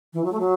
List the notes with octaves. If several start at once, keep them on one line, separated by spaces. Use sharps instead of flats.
E3
F#3
A3
F#3